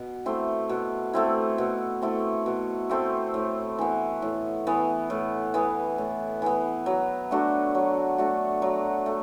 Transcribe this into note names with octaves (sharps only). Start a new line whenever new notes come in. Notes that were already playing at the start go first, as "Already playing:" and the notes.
Already playing: B2
A3 C4 E4
B2
A3 C4 E4
B2
A3 C4 E4
B2
A3 C4 E4
A2
E3 B3
A2
E3 B3
A2
E3 B3
A2
E3 B3
F#3
A3 D4 F#4
F#3
A3 D4 F#4
F#3
A3